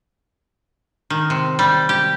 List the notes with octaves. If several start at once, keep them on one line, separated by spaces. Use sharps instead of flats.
D#3
C3
G3
G4